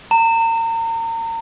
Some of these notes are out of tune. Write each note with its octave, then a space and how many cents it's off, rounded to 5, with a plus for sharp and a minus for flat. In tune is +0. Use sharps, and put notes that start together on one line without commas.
A#5 -35